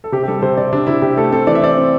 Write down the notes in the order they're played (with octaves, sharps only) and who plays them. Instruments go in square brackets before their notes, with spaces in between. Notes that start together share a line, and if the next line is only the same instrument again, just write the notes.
[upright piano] A4
C3 G4
G4
G3 A4
A4
C3 C5
C3 D5
C3 D4
C3 E4
C3 G4
A3 A4
C4 A4
E3 D5
E5
C4 D5
C4